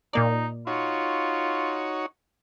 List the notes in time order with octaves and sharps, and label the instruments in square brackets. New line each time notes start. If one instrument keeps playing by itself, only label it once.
[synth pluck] A#2 A#3 D5 [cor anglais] D#4
[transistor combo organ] D#4 F#4 C#5 [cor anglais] F4